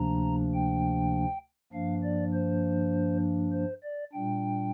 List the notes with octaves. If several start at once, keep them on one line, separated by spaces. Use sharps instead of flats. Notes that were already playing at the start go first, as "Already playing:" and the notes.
Already playing: D2 C3 F3 A#3 D4 A#5
G5
G2 F3 A#3 D4 F5
D5
C5
C5
D5
A#2 G3 D4 G5